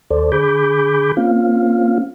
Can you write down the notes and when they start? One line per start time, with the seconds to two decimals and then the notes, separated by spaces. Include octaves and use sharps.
0.10 D#2 A4 C5 D5
0.32 D3 G#4 B5 D6 G6
1.17 A#3 C4 C#4 F4 F5